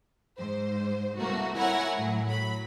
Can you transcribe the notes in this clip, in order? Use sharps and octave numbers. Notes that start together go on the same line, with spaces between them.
G#2 C5
C2 B2 A3 A#3 F#4
E4 A#4 C#5 F#5 G#5 A#5
A2 F#3
F#3 B5